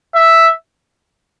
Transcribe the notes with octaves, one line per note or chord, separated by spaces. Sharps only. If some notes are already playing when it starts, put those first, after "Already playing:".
E5